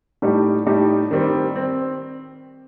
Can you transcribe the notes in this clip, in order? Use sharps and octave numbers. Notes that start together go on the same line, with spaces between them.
A2 G3 D#4 G4
A2 G3 D#4 G4
D#3 G3 C4
C4